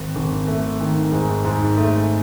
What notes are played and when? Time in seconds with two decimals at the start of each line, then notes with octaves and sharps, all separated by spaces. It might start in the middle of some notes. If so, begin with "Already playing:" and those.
Already playing: G#1
0.16 G#1
0.48 A3
0.81 D#3
1.12 G#2
1.45 G#2
1.78 A3